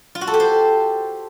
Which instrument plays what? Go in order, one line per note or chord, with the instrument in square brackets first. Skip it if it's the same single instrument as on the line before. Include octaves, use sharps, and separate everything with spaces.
[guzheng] F4
F#4
A4
G4
C5